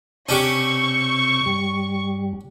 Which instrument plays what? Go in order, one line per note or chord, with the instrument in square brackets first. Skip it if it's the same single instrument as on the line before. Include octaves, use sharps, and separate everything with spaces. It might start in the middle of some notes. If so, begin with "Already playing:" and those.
[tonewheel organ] C3 E6 G6 [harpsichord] C#4 D4 G4 [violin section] C#6
[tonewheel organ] G2 G3